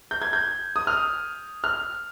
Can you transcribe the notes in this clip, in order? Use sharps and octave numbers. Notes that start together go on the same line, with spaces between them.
G6
G#6
G6
D#6
F6
F6